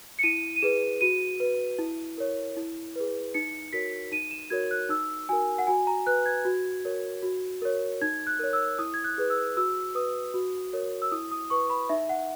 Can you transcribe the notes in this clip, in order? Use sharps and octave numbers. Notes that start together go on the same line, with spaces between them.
C#7
E4 D#7
D#7
G#4 B4 E7
F#4 D#7
B4
E4
A#4 C#5
E4
G#4 B4
D#4 C#7
F#4 A#4 C#5 B6
D#4 D#7
E7
F#4 A#4 C#5 G#6
F#6
D#4 E6
F#4 A#4 G#5
F#5
F#4 G#5
A#5
B4 F#6
G#6
F#4
A#4 C#5
F#4
A#4 C#5
D#4 G#6
F#6
A#4 C#5
E6
E4 D#6
G#6
F#6
G#4 B4
E6
F#4 E6
B4 D#6
F#4
A#4 C#5
E6
E4 D#6
D#6
B4 C#6
B5
D#4 E5
F#5